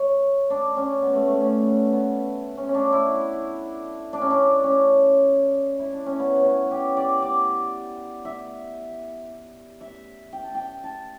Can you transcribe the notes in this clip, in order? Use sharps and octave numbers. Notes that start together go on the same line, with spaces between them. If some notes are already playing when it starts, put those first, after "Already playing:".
Already playing: C#5
D4
C#4
B3
A3
A3
C#4
B3
B3
C#4
C#4
D4
E4
D4
C#4
D4
C#4
E4
D4
C#4
B3
B3 C#4
G4
D5
D5
E5
E5
G5
A5
G5
A5